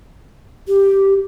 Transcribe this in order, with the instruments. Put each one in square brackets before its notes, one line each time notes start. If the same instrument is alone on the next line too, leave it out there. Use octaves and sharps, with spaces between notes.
[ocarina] G4